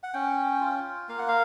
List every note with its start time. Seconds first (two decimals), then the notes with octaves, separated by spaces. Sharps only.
0.03 F#5
0.14 C#4 G5
0.61 F4
1.09 A#3 F5
1.18 F#5
1.28 F5